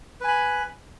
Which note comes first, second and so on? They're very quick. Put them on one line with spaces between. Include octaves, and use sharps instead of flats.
B4 G#5 B5